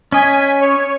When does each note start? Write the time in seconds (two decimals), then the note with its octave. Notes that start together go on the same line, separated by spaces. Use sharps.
0.12 C#4 D#5 G#5 B6
0.61 C#5